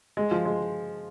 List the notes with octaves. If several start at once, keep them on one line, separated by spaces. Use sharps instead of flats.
G#3
F3
G#3